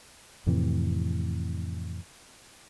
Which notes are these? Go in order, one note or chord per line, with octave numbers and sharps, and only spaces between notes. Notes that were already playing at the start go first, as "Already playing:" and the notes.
F2 A2 C3 E3